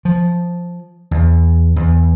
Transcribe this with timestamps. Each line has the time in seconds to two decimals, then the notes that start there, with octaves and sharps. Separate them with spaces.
0.05 F3
1.11 E2
1.76 E2